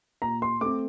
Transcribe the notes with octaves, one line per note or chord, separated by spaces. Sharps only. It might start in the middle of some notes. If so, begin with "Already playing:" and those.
A#2 A#5
C6
A3 C4 D6